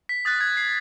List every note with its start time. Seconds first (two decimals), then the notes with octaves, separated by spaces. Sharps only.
0.09 B6
0.25 D#6 F#6 A6
0.41 G#6
0.57 C7